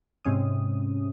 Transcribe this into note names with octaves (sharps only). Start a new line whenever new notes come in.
G#2 C3 C#4 D#6